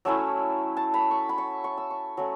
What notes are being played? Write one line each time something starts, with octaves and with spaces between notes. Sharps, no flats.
F#3 A3 C#4 E4 E6
A5
B5
C#6
B5
C#6
C#6
E6
C#6
F#3 A3 C#4 F#4